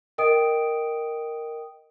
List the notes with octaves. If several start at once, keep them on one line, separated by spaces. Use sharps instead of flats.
A#4 D#5 G5 D#6 D7